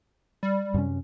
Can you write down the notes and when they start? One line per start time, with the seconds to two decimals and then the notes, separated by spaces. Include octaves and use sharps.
0.43 G3
0.74 F#2 C3 C#4